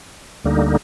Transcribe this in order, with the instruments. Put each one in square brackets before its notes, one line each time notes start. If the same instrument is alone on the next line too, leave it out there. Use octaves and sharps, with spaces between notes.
[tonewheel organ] D2 D3 G3 A#3 D#4